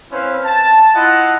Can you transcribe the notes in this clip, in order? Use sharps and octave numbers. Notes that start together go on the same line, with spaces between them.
C4 C#4 E4 B4 C5 F5
A5
E4 F4 D#5 F#5